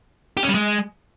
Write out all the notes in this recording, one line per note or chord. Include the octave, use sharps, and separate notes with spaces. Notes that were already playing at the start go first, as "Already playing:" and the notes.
G4
C#4
G3
G#3